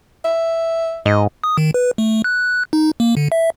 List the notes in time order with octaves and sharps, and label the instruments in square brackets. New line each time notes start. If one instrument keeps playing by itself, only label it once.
[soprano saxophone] E5
[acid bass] G#2 [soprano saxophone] D#5
[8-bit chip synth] D#6
D#3
B4
A3
F#6
D#4
A#3
D3
E5